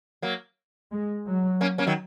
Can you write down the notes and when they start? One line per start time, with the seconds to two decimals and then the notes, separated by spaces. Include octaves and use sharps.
0.22 F#3 A#3
0.92 G#3
1.27 F#3
1.61 A#3 C#4
1.78 A#3 C#4
1.87 D#3 F#3